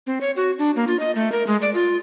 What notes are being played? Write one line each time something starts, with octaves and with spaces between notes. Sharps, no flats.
C4
C#5
F#4
D4
A#3
F4
D#5
A3
A#4
G#3
D5
F4